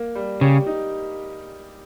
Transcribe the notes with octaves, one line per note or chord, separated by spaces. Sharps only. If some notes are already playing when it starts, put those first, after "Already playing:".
Already playing: A#3
G3
C#3 G4
D#4